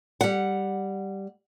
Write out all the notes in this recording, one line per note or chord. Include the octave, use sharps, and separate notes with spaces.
G3 F#5